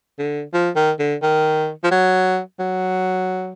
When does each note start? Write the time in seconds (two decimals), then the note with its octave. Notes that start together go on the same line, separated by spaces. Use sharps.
0.19 D3
0.54 F3
0.76 D#3
0.99 D3
1.22 D#3
1.84 F3
1.91 F#3
2.59 F#3